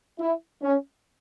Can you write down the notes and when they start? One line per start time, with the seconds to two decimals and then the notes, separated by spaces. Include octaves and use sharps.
0.19 E4
0.62 C#4